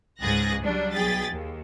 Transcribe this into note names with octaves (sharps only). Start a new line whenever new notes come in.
C#2 G#2 G#4 F#6 A6 A#6
F#3 G3 D4
B1 G#4 G5 A6 B6
D#2